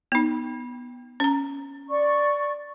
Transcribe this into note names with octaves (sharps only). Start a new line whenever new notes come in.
B3 D#4
C#4 A#5
D5 C#6